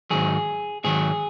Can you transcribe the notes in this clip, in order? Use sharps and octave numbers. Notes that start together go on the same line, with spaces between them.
G#2 D#3 F#3 G#4
G#2 D#3 F#3 G#4